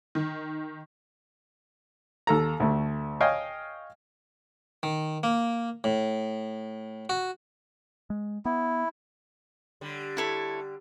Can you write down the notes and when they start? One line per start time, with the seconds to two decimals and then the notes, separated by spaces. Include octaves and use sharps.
0.15 D#3
2.27 D#2 A4 A#5
2.60 D2 A3
3.20 C#5 D#5 F5 G5 G#5
4.83 D#3
5.23 A#3
5.84 A2
7.09 F#4
8.10 G#3
8.45 B3 E4
9.81 D3 G3
10.17 E4 A4 C#5